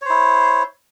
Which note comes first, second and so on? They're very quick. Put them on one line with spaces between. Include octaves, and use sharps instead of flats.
C#5 C5 E4